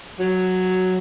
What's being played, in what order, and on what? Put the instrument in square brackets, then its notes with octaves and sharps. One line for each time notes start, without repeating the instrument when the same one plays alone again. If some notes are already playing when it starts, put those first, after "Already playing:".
[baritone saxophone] F#3